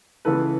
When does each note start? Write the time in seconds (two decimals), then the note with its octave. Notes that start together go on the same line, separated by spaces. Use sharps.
0.25 C#2 C#3 E3 A4 B4